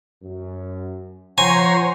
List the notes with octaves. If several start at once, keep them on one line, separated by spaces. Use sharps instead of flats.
F#2
F3 C5 C#5 F#5 G#5 A#5